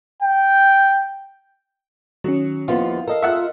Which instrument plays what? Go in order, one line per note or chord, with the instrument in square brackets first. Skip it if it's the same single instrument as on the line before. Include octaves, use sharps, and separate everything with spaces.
[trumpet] G5
[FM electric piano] D#3 C#4 [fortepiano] F#3
[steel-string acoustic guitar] D#2 F3 B3 [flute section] E4 [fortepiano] F4
[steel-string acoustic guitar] A4 F5 [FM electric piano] A#4 D#5
[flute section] F4 F6 [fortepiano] E5 F#5 E6